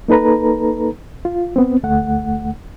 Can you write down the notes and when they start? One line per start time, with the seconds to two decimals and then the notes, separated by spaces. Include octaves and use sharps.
0.08 A#3 D#4 A4 B4 A#5
1.25 F4
1.56 B3 C4
1.83 D2 A3 F#5